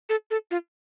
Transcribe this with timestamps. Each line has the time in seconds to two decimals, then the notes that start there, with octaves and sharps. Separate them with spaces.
0.09 A4
0.31 A4
0.51 F4